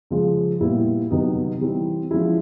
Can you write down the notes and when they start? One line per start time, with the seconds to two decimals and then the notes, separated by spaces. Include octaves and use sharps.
0.11 C#3 F3 G#3
0.61 A#2 G3 B3 E4
1.10 C3 D#3 F#3 B3 D#4
1.61 E3 G3 C4
2.11 F3 G#3 C#4 E4